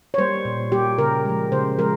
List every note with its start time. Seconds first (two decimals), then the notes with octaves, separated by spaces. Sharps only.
0.14 C#5
0.18 G3 A#3 C5
0.45 A#2
0.72 G3 A#3 G4
0.98 C#3 A#4
1.25 F3 G#3
1.52 C#3 C5
1.79 F3 G#3 A#4